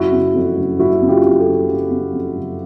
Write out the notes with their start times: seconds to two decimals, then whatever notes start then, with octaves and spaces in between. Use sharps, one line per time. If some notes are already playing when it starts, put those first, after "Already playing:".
Already playing: F#1 E4 F#4
0.12 C#3
0.34 F2
0.57 F#1
0.79 F#1 E4 F#4
1.02 C#3
1.09 F4 G4
1.24 F2
1.39 G4 A4
1.47 F#1
1.69 F#1
1.91 C#3
2.13 F2
2.36 F#1